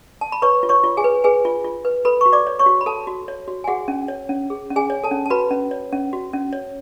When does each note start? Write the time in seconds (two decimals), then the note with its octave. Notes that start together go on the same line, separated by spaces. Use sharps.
0.21 A5
0.32 B5
0.42 B4 C#5 C#6
0.63 F4
0.69 C#5 C#6
0.84 F4
0.97 G#4 G#5
1.04 B4
1.24 G#4 B4 G#5
1.45 F4
1.64 F4
1.85 B4
2.05 A4 B4 B5
2.21 F#4 C#6
2.33 D5 D6
2.47 C#5
2.59 C#5 C#6
2.66 F#4
2.81 B5
2.86 A4 A5
3.07 F#4
3.28 C#5
3.48 F#4
3.64 G#5
3.68 F#4 G#4 F#5
3.88 C#4
4.08 C#5
4.29 C#4
4.50 G#4
4.70 C#4
4.76 G#4 G#5
4.90 C#5
5.04 A4 A5
5.11 C#4
5.26 A5
5.30 F#4 B4 B5
5.51 C#4
5.71 C#5
5.93 C#4
6.13 F#4
6.33 C#4
6.53 C#5